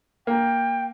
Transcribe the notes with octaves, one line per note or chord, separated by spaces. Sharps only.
A#3 G5